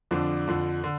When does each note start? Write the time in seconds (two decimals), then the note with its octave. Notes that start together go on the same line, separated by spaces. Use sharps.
0.11 F2 D3 F3 D4
0.47 F2 D3 F3
0.84 D3